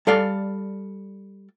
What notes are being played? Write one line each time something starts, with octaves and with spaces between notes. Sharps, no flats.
G3 A4 D5 F5